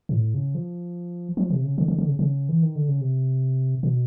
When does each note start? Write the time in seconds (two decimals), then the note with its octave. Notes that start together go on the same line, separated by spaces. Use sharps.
0.09 A#2
0.14 A2
0.34 C#3
0.55 F3
1.37 F3
1.50 C3
1.64 C#3
1.78 D3
1.88 D3
1.98 D3
2.09 C#3
2.19 C#3
2.49 E3
2.63 D#3
2.76 D3
2.89 C#3
3.01 C3
3.83 B2